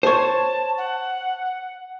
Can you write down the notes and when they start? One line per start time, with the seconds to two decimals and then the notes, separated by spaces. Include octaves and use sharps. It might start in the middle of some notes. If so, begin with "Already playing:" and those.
0.03 C5 C#5 A5
0.78 F#5